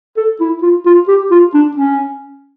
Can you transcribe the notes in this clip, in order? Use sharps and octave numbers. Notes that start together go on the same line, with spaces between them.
A4
E4
F4
F4
G4
F4
D4
C#4